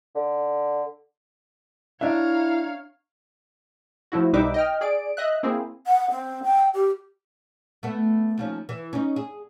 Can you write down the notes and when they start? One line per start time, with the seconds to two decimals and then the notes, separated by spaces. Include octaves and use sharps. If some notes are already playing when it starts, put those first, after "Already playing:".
0.15 D3
2.01 D4 E4 C#5 E5 F5 A#5
4.12 F3 A3 E4 F#4
4.33 B1 G3 D#4 B4 E5 D6
4.54 D#5 G5 F6
4.81 G#4 D5 D7
5.17 D#5 E5 F#6
5.43 A#3 C4 E4 G#4
5.87 F#5
6.11 C4
6.43 G5
6.74 G4
7.83 A3 B3
8.38 D#2 F3 C#4
8.69 E3
8.93 C#4 D#4
9.16 G#4